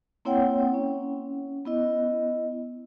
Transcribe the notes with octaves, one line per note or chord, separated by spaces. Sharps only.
A#3 C4 E4 C#5 F#5 G5
C#4
B3 E4 D#5